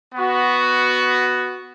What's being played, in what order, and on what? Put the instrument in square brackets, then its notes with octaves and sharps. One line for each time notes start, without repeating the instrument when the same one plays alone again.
[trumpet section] B3 F#4